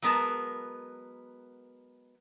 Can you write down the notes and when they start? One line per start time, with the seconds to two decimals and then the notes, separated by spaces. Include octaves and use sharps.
0.02 F#3 G#3 B3 A#4 A5